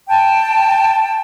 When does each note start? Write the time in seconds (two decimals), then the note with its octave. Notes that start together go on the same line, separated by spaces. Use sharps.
0.08 G5 A5